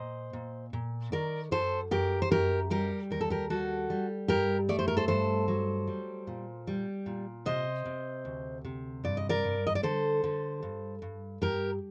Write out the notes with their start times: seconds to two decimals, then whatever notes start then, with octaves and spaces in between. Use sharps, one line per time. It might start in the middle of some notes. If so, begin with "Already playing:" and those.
Already playing: A#2 C5 D#5
0.33 A#2
0.73 A#2
1.12 D#3 A#4 D5
1.51 F#2 A4 C5
1.91 F#2 G4 A#4
2.22 C5
2.31 F#2 G4 A#4
2.70 G3 G4 A#4
3.11 D#2 A#4
3.21 A4
3.30 G4 A#4
3.50 G3 F#4 A4
3.90 G3
4.28 G2 G4 A#4
4.69 A3 D5
4.79 C5
4.88 A#4
4.97 A4 C5
5.08 G2 A4 C5
5.48 F#3
5.87 G3
6.27 A#2
6.67 G3
7.06 A#2
7.46 C3 C5 D#5
7.85 C3
8.25 D2
8.65 C3
9.04 G2 D5
9.17 D#5
9.29 A#4 D5
9.44 G2
9.67 D#5
9.75 D5
9.83 D3 A4 C5
10.24 D3
10.63 G2
11.02 G2
11.41 G2 G4 A#4